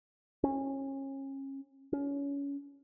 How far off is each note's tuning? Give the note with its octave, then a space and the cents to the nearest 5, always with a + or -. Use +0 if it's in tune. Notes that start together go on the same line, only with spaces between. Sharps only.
C#4 -30
C#4 +25